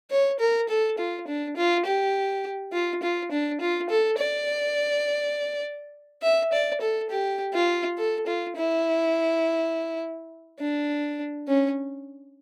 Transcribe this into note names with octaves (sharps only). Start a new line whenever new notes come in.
C#5
A#4
A4
F4
D4
F4
G4
F4
F4
D4
F4
A4
D5
E5
D5
A4
G4
F4
A4
F4
E4
D4
C#4